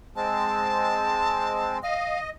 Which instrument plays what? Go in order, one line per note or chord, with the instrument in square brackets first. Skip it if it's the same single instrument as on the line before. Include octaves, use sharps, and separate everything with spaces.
[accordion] G#3 C4 [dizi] A5
[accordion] D#5 [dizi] F5